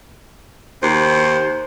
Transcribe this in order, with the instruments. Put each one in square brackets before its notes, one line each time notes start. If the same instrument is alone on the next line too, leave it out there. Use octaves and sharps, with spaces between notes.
[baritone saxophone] D#2 [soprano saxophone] C5